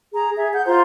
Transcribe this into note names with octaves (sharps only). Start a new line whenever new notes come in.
G#4 A#5
G#4 E5
F#5 G6
F4 C5 A#5 C6